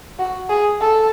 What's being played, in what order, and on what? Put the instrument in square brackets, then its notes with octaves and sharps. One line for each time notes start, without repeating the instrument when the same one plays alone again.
[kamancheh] F#4
G#4
A4